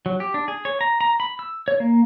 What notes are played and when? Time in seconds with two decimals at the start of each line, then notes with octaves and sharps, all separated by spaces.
0.06 F#3
0.20 G4
0.34 D4
0.48 G#4
0.65 C#5
0.81 A#5
1.01 A#5
1.20 B5
1.39 E6
1.68 C#5
1.80 A#3